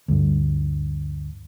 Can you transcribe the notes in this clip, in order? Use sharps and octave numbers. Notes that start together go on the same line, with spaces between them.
D2 G2